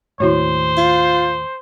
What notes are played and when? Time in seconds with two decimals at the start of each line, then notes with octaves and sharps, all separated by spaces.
0.20 D#2 A2 E4 F#4 C5 C#5
0.78 F4